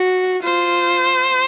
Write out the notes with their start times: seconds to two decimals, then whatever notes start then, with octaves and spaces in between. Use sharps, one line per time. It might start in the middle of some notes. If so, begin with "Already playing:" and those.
Already playing: F#4
0.44 F4 C5